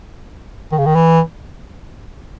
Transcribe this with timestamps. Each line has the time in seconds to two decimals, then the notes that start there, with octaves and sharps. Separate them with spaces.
0.72 D#3
0.78 C#3
0.86 D#3
0.95 E3